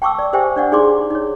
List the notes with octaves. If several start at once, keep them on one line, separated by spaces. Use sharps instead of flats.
G5 A5 C#6 D6 E6
D5
G4 C5 E5 G5 G#5
D4 D5 F#5
D#4 G#4 D5 C6 D6
D#4 C#5